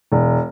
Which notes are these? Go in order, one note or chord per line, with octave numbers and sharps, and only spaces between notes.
E1